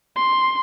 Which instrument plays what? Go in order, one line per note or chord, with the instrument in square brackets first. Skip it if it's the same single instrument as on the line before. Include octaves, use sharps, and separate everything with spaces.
[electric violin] C6